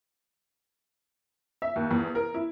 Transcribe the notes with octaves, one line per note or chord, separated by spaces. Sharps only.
E5
D#2
E2
A#4
E4